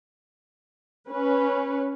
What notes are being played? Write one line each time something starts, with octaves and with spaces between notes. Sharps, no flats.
C#4 B4